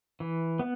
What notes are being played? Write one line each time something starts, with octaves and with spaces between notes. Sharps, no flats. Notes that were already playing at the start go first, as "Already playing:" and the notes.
E3
B3